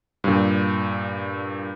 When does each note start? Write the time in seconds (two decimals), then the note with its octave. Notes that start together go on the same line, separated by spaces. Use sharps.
0.24 G2 A#2